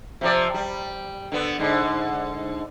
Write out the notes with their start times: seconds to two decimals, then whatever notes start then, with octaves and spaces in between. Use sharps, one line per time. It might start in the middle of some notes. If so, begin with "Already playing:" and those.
0.21 C3 F3 D5
0.54 G3
1.32 D3 B3
1.59 G#2 D3